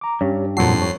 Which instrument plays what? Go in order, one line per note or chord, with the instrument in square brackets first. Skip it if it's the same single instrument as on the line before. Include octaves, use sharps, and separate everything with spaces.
[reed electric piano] A#5 D6
[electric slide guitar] G2 [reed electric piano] C#4 G4 [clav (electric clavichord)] C#5
[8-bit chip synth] F2 C7 [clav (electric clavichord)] A#2 F#3 F#4 [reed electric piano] A5
[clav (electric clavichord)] C#5